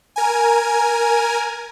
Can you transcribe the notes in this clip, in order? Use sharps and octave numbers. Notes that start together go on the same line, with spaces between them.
A#4 G#5